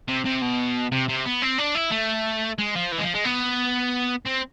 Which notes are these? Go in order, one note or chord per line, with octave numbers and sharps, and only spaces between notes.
C3
C3
B2
C3
C3
B3
C4
D4
E4
A3
G#3
F3
E3
G#3
F3
G#3
B3
C4